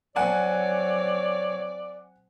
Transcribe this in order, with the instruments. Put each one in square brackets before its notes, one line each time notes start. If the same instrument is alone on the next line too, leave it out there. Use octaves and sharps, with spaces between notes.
[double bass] F#3 C4 [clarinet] C#5 [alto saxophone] D5 [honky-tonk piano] F#5 G#5 A5